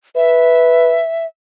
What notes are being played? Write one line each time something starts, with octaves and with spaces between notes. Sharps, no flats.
B4 E5